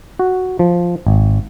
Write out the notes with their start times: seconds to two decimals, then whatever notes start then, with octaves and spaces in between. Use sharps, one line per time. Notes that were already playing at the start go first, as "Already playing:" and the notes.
0.19 F#4
0.59 F3
1.07 G#1